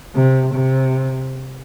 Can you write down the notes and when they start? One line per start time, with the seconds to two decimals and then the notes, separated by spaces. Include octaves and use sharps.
0.15 C3
0.55 C3